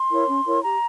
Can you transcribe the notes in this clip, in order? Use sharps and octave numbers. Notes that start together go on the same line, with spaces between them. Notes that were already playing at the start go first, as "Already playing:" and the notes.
Already playing: C6
E4 A#4 C#5
C#4
E4 A#4 C#5
G4 A#5